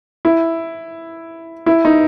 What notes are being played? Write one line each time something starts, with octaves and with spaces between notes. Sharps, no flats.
E4
E4
D#4